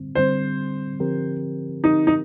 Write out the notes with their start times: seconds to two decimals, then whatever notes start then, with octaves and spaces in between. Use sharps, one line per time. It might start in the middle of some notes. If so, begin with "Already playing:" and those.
Already playing: D3 G3 C4
0.15 D3 G3 C4 C5
1.00 D3 F3 C4 G4 A#4
1.84 D3 F3 C4 D#4 G4 A#4
2.07 D#4